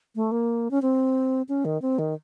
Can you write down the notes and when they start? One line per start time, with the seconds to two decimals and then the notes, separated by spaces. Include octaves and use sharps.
0.15 A3
0.32 A#3
0.71 C#4
0.82 C4
1.49 C#4
1.65 D#3
1.82 C4
1.99 D#3